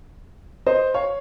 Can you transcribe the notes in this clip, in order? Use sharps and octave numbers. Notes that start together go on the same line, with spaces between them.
C5 D#5
C#5 F5